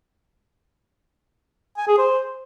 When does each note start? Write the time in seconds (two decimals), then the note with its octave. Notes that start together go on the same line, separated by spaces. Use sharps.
1.77 G#5
1.88 G#4
1.98 C5